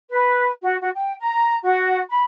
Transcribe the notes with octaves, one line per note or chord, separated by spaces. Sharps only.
B4
F#4
F#4
G5
A#5
F#4
B5